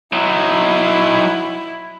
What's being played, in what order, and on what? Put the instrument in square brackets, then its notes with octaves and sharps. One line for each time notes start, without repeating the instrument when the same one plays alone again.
[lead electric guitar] F#3 D#4 [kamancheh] E4